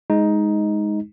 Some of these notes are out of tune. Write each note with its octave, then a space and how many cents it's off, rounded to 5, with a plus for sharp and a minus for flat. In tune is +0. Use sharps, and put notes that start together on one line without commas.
G#3 +0 D#4 +10